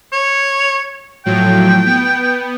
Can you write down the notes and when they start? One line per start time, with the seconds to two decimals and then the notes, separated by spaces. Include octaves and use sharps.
0.13 C#5
1.26 A2 F3 F#3 G5
1.85 B3